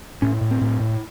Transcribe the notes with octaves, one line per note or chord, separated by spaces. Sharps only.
A2 C#4
A2
C4
A2
A2